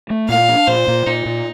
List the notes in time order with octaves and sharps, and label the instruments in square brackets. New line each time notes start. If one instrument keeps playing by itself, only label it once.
[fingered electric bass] A3
[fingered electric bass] A#2 [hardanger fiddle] F5
[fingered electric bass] D4
[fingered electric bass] A#2 [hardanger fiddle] C5
[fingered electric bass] A#2
[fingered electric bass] A#2 [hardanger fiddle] D#4
[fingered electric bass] A#2